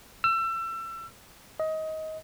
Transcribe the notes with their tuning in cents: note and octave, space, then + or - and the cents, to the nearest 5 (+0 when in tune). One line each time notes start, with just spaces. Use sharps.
E6 +30
D#5 +20